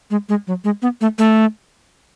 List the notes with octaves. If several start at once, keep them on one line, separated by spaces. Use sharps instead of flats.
G#3
G#3
F#3
G#3
B3
A3
A3